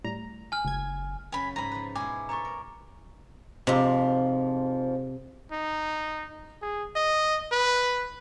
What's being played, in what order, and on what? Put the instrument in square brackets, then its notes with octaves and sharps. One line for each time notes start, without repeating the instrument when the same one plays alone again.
[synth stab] A2 G3 A#5
[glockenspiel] G#5 F6
[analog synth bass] F#1 [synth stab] C#2 G#6
[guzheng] F#2 C#3 F#3 [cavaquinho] G#5 B5
[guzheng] G#2 G#5 [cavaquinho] A#5 B5
[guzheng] F3 B4
[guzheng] B2 G#3 E4 [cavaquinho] G#5 [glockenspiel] D6
[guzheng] A4 B4 C#5 [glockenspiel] A#5 C#6
[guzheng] A#4
[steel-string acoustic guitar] F2 G#2 F3 [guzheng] C3
[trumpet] D#4
G#4
D#5
B4